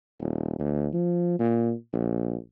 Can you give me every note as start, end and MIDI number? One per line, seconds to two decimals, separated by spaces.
0.20 0.55 27
0.59 0.87 38
0.93 1.36 53
1.39 1.73 46
1.93 2.36 34